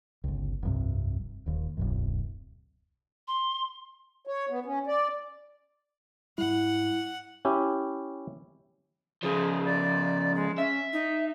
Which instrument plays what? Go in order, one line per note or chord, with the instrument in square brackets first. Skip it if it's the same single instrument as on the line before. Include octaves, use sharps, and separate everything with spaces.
[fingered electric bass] G1 C#2
F1 C2 G2 C3
D#1 D#2
D1 B1 F#2
[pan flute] C6
[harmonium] C#5
B3
C#4
D5
[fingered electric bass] G#2 G3 [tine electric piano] E4 [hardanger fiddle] F#5
[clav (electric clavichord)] C#4 E4 G4
[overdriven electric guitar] C#3 F3 [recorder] G#4
[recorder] D5
G#3
[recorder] C#4 [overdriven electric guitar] E5
[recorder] D#4